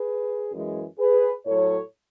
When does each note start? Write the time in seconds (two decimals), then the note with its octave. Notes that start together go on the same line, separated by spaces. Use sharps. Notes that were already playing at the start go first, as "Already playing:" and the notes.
Already playing: G#4 B4
0.52 F#2 E3 G#3
0.99 G#4 B4
1.46 A2 F#3 A4 C#5